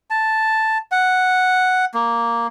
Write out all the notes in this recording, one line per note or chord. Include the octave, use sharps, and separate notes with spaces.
A5
F#5
A#3